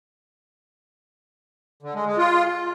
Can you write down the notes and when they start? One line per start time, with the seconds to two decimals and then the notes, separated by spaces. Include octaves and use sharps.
1.83 D3
1.94 G#3
2.06 G#3
2.18 F4